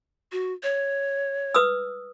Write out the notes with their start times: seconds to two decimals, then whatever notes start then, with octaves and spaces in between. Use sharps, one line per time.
0.32 F#4
0.63 C#5
1.54 B4 D#6 E6